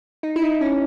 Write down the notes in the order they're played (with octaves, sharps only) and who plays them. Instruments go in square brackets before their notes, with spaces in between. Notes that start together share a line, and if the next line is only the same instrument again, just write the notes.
[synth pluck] D#4
E4
D#4
C#4